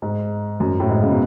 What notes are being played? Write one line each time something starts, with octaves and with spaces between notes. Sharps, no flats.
G#2
F#2
A2
G#2
C#3
B2